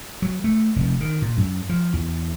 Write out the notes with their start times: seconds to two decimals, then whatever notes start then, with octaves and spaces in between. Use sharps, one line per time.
0.22 F#3
0.44 A3
0.76 F1
1.01 D#3
1.22 A#2
1.37 F#2
1.69 F3
1.93 E2